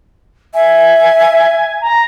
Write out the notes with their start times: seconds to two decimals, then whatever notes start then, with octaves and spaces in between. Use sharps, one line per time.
0.54 E5 G#5
1.81 A#5